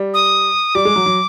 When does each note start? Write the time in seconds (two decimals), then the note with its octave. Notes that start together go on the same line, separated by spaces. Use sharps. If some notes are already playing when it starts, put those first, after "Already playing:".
Already playing: G3
0.14 D#6
0.75 G3 D6
0.85 G#3
0.96 F#3
1.06 F#3